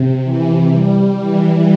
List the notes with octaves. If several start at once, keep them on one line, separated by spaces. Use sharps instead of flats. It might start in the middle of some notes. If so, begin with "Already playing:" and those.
Already playing: C3
E3
G3
E3